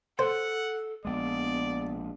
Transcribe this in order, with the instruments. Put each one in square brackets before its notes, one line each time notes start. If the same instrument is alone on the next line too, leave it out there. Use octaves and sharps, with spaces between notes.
[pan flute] A4 [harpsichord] C5 [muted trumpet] F#5
[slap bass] A#1 G#3 [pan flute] B3 [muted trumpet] D5